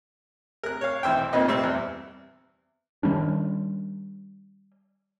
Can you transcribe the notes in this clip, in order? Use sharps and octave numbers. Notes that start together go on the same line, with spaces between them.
A#4 F#6
C#5 F5
B1 E3 C5 E5 G5
F2 A#2 A#3 D#4 B4 D#5
G3 C4 E5
E2
D#3 G3 C#4 D4